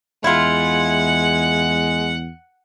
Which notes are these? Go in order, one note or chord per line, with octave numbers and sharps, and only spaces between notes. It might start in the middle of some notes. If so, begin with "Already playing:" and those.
E2 G#3 E4 F4 F#5